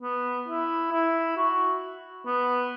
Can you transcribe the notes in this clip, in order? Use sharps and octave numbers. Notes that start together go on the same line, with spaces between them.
B3
E4
E4
F#4
B3